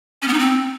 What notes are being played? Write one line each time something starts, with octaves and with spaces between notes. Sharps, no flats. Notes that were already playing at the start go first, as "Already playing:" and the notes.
C#4
B3
D#4
C4